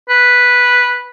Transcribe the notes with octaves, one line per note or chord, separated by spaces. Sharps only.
B4